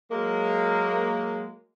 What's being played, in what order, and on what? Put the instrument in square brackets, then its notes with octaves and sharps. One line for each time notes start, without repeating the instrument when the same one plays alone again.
[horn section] F#3 G#3 A#3